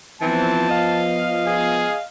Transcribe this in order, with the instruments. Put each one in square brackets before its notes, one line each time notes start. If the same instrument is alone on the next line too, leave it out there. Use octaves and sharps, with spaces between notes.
[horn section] E3 C4 [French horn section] F3 B3 [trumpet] A5
[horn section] D#5 F5
[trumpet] G#4